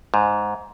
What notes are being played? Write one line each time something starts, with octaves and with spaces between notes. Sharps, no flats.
G#2